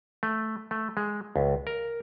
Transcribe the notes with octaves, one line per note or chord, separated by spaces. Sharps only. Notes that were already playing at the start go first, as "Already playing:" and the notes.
A3
A3
G#3
C#2
A#4